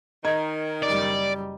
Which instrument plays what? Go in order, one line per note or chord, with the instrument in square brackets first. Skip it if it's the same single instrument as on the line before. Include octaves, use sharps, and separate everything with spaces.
[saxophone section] D#3 [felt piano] D#5 A#5 G#6
[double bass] F#1 G3 [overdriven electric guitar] D5